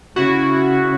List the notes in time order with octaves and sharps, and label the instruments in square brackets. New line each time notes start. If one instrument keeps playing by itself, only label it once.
[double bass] C#3 [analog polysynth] E4 F#4